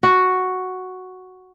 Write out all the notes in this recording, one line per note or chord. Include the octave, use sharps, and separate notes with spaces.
F#4